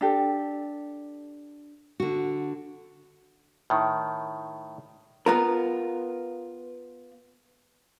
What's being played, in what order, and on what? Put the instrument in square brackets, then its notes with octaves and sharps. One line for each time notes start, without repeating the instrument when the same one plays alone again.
[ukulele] D4 G4 A4
[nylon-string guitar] D3 F#4
[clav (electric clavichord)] A2 D#3
[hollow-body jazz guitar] B3 F4 A#4